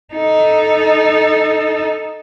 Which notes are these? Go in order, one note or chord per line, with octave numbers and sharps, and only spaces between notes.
D#4 A4